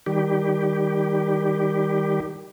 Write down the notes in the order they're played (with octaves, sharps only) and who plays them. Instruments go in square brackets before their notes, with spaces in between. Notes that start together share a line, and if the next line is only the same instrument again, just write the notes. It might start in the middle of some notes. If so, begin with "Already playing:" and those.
[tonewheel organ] D#3 G3 G4